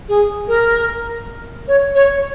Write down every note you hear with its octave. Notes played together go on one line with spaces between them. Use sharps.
G#4
A#4
C#5
C#5